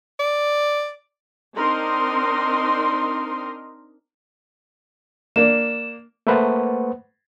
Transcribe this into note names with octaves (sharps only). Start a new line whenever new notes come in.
D5
C4 D4 D#4 A#4 D#5 C6
A#3 D4 E7
A3 A#3 B4 C5 F#5